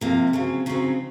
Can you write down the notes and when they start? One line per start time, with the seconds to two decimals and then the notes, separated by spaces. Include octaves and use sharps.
0.01 C3 F3 A#3
0.33 C#3 F#3 C4
0.66 C#3 F#3 C4 D#4